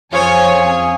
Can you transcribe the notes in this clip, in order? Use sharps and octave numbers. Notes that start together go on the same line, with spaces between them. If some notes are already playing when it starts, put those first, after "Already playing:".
F2 C#4 F4 G#4 C5 C#5 G#5